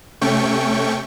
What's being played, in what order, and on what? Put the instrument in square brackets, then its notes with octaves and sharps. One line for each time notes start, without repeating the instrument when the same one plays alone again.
[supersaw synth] C3 A3 C#4 G5 C#6